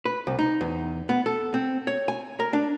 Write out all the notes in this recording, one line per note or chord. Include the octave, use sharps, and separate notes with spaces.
B4
C2
D#4
E2
B3
A4
C4
C#5
G#5
A#4
D4